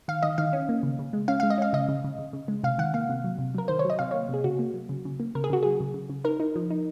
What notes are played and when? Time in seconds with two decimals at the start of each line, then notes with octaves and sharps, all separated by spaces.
0.08 D#3 F5
0.23 D#3 D#5
0.38 D#3 F5
0.53 C#4
0.69 A#3
0.83 C#3
0.99 C#3
1.13 G#3
1.28 C#4 F5
1.40 G#3 F5
1.50 D#5
1.58 C#4 F5
1.73 C#3 D#5
1.88 C#3
2.04 C#3
2.19 C#3
2.33 C#3
2.48 G#3
2.64 C3 F5
2.78 D#3 F#5
2.94 A#3 F5
3.09 C3
3.24 F#3
3.39 C3
3.55 F#3 A#4
3.68 D#3 C5
3.79 C#5
3.85 F#3 D#5
3.99 C3 F5
4.11 A#3 C#5
4.29 C3 G#4
4.44 C#3 F#4
4.59 A#3
4.74 F#3
4.89 C#3
5.05 C#3
5.20 A#3
5.35 C#3 A#4
5.44 G#4
5.50 C#3 F#4
5.63 F#3 G#4
5.80 C#3
5.94 C#3
6.10 C#3
6.24 D#4 A#4
6.40 D#4
6.56 F3
6.70 D#4